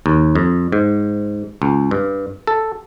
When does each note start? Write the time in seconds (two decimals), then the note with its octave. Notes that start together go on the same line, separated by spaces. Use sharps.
0.06 D#2
0.35 F2
0.72 G#2
1.62 C#2
1.91 G2
2.47 A4